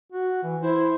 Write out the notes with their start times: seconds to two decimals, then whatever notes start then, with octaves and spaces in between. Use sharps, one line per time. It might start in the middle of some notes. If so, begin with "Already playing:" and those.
0.12 F#4
0.43 E3
0.62 E4 C5